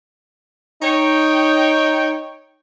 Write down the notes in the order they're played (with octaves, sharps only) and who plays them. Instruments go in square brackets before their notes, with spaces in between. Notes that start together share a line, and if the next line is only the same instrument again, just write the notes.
[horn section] D#4 C#5 G5